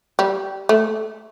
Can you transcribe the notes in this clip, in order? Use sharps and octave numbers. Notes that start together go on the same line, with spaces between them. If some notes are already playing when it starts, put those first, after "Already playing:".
G3
A3